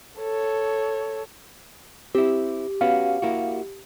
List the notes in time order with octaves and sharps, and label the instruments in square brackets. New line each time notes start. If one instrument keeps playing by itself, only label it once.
[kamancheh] A4 C#5
[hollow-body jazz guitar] C4 E4 [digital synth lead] G4
[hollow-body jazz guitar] B3 C#4 F#4 [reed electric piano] F5
[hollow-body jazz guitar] A#3 E4 F#4